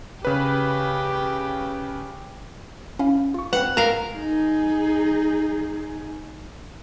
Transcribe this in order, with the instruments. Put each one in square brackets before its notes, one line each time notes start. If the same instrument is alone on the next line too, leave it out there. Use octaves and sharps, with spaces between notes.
[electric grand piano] C#3 B4 [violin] G4
[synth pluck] C#4 E4 F5
F4 C#6
[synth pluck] C4 B4 [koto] F#5
[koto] A#4 F5
[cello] D#4 G#4